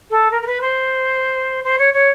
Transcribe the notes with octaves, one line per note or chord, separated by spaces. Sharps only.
A4
A#4
A#4
B4
C5
C5
C#5
C#5